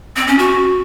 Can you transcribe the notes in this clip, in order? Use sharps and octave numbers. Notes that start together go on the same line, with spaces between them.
C4
C#4
F#4